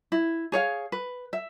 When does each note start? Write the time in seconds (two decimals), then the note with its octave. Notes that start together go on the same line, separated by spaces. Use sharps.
0.12 E4
0.52 G#4 C#5 F5
0.92 B4
1.33 E5